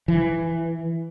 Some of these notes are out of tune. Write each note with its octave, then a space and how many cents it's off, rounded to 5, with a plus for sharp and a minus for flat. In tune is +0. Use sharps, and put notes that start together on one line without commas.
E3 +5